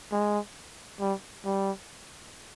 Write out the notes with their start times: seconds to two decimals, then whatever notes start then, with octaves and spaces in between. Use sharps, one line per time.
0.12 G#3
1.00 G3
1.45 G3